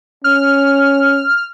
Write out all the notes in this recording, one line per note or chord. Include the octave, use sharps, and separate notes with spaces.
C#4 F6